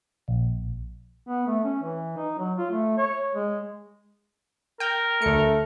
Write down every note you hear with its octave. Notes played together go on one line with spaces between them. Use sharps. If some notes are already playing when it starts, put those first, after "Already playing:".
A#1
B3
A3
C#4
E3
D#4
F#3
F4
A3
C#5
G#3
A#4 G5
D2 A3 C#7